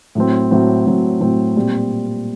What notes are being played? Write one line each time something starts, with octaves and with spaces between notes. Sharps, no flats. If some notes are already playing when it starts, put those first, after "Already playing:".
A2 F#3 C4
A2 F#3 C4
A2 F#3 C4
A2 F#3 C4
A#2 G3 C4